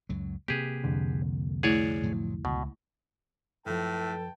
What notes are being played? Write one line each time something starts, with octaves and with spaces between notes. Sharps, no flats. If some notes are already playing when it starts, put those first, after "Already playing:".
C#2 F#2 F#3
C3 A#3 G4 G#4 B4
C2 F2 D3
A3 E4 G#4 C#5 D5
A2 F3 F#3
C#2 B2
F#2 A2 F3 A4 B4 G5 A5